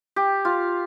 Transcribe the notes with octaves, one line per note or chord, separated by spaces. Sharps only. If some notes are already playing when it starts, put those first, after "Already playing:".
G4
F4